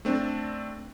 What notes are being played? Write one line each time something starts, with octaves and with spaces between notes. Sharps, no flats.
A3 C4 D4